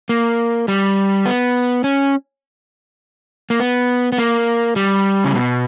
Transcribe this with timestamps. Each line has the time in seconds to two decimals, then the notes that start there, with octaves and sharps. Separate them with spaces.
0.09 A#3
0.68 G3
1.26 B3
1.84 C#4
3.50 A#3
3.60 B3
4.12 B3
4.18 A#3
4.76 G3
5.24 C#3
5.35 B2